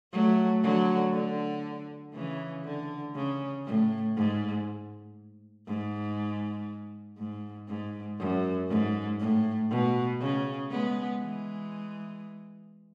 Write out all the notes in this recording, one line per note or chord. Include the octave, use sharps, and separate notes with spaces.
F#3 A3
D3 F#3
D3
C#3 E3
D3
C#3
A2
G#2
G#2
G#2
G#2
F#2
G#2
A2
B2
C#3
G#3 B3
E3 G#3